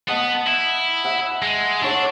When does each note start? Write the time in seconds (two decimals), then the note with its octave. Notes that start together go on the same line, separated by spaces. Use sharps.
0.08 B3 D#5 F#5 A5
0.47 E4
1.04 E5 F#5
1.42 G#3
1.82 D4 A4 C#5 F#5